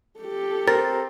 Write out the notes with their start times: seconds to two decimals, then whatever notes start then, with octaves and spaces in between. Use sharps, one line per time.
0.20 G4 A4
0.68 C4 A#4 A6